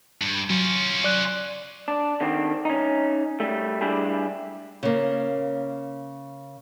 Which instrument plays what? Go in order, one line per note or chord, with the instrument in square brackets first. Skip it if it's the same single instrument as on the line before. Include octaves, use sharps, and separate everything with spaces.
[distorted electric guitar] G2
[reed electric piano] F#3 [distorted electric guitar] C#4 F4
[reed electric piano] D5 F#6
[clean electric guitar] D4
D3 D#3 C4 D4
C#4 D#4
G3 A3
G3 D4 E4 G4 G#4
[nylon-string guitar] C#3 A#3